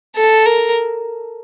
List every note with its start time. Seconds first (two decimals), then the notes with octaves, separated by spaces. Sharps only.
0.16 A4
0.46 A#4